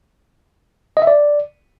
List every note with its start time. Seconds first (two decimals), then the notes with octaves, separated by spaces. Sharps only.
0.97 D#5
1.02 E5
1.07 D5